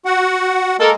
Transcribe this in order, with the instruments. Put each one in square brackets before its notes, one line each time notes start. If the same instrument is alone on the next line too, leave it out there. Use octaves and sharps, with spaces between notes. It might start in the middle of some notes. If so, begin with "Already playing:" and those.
[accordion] F#4 F#5
[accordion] G#3 A#3 [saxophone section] A4 A#4